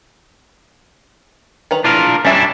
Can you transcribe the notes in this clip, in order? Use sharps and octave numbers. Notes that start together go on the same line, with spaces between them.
D#3 B4 A#5
D4 E4 F4 A#4
G3 C#4 D4 E4 E5